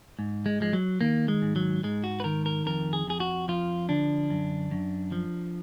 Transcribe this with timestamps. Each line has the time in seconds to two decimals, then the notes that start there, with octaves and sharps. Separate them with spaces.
0.19 G#2
0.46 G#3
0.60 F3 G#3
0.73 F#3
1.01 D#3 A#3
1.28 G#3
1.42 G#2
1.56 F#3
1.83 G#2 G#3
2.04 F#4
2.20 B4
2.24 D#3 A#4
2.46 A#4
2.66 F2 A#4
2.93 G#4
3.07 F2 G#4
3.20 F#4
3.48 F3 F4
3.89 D3 D4
4.30 F#2
4.71 F#2
5.12 F3